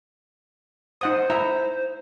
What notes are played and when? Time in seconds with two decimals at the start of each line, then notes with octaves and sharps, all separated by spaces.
1.01 D#4 C5 F#5 D#6
1.30 E4 E5 A#5